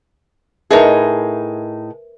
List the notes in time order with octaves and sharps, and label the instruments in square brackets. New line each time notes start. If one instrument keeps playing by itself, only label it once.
[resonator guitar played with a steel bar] A2 D#4 G#4 [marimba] A#4 B4 E5